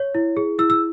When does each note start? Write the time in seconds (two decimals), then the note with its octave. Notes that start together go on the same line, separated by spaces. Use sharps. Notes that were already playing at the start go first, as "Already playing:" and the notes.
Already playing: C#5
0.15 E4
0.37 G#4
0.59 E4 E6
0.70 E6